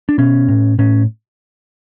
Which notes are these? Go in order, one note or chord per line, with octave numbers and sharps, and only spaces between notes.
D4
B2 C#4
A2
A2 C#4